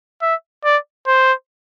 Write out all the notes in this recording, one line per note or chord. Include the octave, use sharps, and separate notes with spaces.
E5
D5
C5